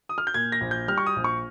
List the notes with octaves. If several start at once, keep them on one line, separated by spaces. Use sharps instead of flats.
D#6
F6
G6
A#2 G#6
A#6
A#1
G6
G3 F6
C#6
D#6
A#1
C#6